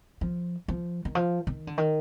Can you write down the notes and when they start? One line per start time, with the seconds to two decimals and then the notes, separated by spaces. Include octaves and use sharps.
0.21 F3
0.68 F3
1.05 D#3
1.15 F3
1.47 D#3
1.67 D3
1.78 D#3